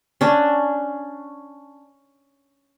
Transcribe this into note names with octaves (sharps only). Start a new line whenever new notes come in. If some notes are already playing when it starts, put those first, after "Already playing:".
C#4 D4